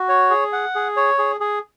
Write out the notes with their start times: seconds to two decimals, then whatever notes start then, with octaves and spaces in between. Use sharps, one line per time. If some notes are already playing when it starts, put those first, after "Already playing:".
Already playing: F#4
0.09 C#5
0.30 G#4
0.52 F#5
0.75 G#4
0.97 C#5
1.18 G#4
1.40 G#4